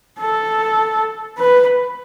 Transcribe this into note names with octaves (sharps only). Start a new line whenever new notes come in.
A4
B4